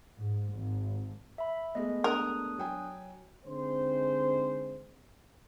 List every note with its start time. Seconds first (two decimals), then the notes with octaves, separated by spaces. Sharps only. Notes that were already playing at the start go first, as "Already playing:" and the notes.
0.18 G#2
0.54 G#1
1.38 E5 B5
1.75 G#3 A3 B3 D#5
2.04 D4 A#4 D#6 F#6
2.58 F#3 G5 G#5
3.45 D3 G#3 C4 D#4 C5